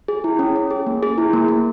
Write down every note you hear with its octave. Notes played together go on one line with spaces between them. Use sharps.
G#4
E4
C#4
C#4
G#4
A#3
G#4
E4
A#3
A#3